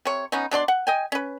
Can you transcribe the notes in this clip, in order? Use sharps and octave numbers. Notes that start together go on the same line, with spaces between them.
C3 C#5
B3 C#4 D#4
B2 D4 D5 C6
F#5
D#5 G5 G#5
C#4 B4